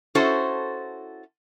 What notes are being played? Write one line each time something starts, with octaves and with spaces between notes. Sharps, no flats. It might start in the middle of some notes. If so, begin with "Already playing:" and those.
C#4 E4 F#4 A4 C5